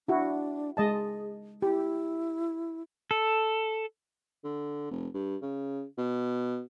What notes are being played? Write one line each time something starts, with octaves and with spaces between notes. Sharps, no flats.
D4 E4 F#4
G#3 G#4 D#5 A5
E4 G4
A4
D3
F1
G2
C#3
B2